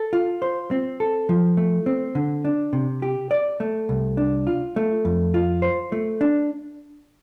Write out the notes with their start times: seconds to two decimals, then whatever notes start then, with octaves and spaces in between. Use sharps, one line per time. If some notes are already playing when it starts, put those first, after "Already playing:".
Already playing: A4
0.13 F4
0.42 C5
0.71 C4
1.00 A4
1.29 F3
1.57 A3
1.86 C4
2.15 D3
2.45 D4
2.73 C3
3.02 G4
3.31 D5
3.60 A3
3.89 C2
4.17 D4
4.47 F4
4.76 A3
5.05 F2
5.34 F4
5.62 C5
5.92 A3
6.21 D4